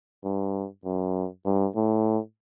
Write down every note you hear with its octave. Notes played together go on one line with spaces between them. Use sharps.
G2
F#2
G2
A2